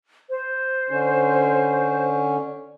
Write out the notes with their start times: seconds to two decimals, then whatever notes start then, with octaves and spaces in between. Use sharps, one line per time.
0.30 C5
0.90 D3 C#4